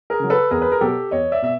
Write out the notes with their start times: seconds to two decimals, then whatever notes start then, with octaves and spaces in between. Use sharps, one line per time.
0.10 G#4 A#4
0.20 C#3 F#3
0.30 A4 B4
0.51 E2 G#4 A#4
0.62 B4
0.72 A#4
0.81 B2 F#3 G4 A4
1.11 E2 C#5 D#5
1.32 D5 E5
1.42 B2 E5